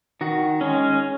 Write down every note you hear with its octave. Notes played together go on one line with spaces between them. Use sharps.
D#3 F#4
G#3 C#4